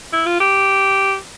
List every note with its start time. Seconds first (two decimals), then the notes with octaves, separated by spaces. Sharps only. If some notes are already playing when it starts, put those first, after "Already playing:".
0.13 E4
0.26 F4
0.40 G4